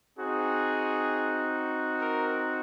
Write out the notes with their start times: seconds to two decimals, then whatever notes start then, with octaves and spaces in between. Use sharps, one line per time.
0.17 C4 D#4 F#4 G#4
2.00 A#4